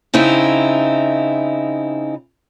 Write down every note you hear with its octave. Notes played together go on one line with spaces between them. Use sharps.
C#3 C4 D#4 E4